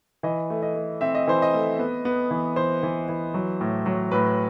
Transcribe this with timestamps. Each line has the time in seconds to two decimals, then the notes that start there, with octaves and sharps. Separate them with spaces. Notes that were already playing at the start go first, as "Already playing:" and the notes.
0.23 E3 D#5
0.50 A3
0.63 D#5
0.75 A3
1.01 C4 E5
1.15 D#5
1.27 E3 C5
1.42 D#5
1.54 A3
1.79 B3
2.05 B3
2.31 E3
2.56 E3 C5
2.83 E3
3.08 E3
3.34 F#3
3.61 A2
3.86 F#3
4.11 A2 B4